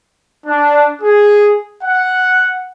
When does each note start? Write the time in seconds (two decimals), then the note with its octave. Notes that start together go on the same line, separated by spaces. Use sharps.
0.46 D4
1.02 G#4
1.83 F#5